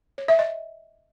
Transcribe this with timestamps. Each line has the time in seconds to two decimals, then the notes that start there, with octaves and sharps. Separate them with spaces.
0.18 C#5
0.28 E5
0.39 D#5